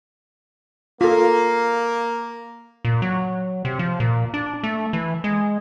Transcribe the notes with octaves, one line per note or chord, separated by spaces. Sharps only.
A#3 F4 A4
A#2
F#3
C3
F3
A#2
D4
A3
E3
G#3